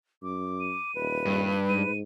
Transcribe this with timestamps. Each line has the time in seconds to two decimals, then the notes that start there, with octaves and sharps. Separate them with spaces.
0.23 F#2 D6
0.60 D#7
0.95 D#1 B4
1.26 G2
1.69 G#2 D#7